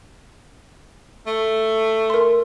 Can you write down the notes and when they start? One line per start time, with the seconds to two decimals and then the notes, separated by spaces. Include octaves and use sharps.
1.27 A3
2.10 A#4 C6